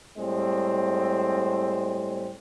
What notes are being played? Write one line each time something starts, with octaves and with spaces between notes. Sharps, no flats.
A2 G3 G#3 C4